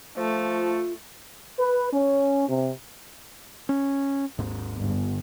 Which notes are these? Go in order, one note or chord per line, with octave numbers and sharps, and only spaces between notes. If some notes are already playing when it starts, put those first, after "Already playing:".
F3 A3 F4
B4
C#4
C3
C#4
G#1 D#2 G#2
G1